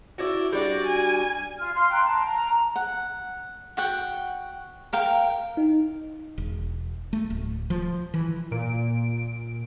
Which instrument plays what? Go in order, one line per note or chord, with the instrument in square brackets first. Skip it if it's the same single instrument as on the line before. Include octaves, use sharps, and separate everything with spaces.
[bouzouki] D4 E4 F#4
[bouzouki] G3 D4 F#4 [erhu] D5
[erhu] G#5
[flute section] F4 F6
F5 C6 F6
G5 A#5 C6 F#6
A5 A#5
A#5
[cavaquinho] F#5
F#4 F#5 G5
A#4 F5 G5
[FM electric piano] D#4
[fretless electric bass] E1
A3
D1
F3
E3
[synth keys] A#2 D7